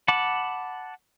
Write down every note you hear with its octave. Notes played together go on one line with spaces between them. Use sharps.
F#5 A5 B5 D6